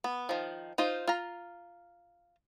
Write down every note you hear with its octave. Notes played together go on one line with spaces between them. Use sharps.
B3
D#3 F3
D#4 F4 C5
F4 A#5